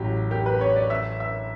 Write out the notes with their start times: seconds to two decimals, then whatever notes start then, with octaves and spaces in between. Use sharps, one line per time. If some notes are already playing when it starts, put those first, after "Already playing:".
Already playing: A1 A2 F#3 C#4 G4
0.31 G4
0.46 B4
0.61 C#5
0.76 D5
0.90 E5
1.20 E5